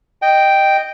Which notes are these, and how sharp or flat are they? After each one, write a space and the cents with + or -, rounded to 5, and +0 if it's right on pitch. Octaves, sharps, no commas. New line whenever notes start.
D#5 -10 G5 +0